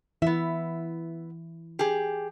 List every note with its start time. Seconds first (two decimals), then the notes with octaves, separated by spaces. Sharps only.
0.22 E3 B3 E4 E5
1.79 G4 G#4